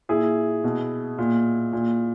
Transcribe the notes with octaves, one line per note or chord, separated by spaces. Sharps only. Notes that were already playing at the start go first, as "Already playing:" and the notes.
A#2 E4 G#4
B2
A#2
A#2